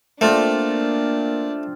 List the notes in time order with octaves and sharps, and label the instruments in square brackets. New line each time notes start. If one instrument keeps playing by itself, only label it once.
[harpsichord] A3 [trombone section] A#3 [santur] C4 F4 D5 [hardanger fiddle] D4